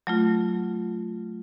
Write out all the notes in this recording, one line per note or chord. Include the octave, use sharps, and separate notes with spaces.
F#3 A3 F4